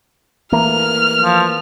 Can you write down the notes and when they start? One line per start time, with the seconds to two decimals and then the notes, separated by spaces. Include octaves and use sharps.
0.52 E3 A3 A#3 F6
1.22 F3